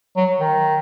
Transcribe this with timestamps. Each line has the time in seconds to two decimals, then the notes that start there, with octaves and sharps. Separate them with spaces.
0.17 F#3
0.40 D#3